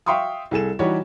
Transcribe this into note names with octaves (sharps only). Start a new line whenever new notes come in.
E5 F5 G5 C6 C#6 D#6
C2 G#4 A4 E7
E3 G3 D#4 F#4 G4 C#5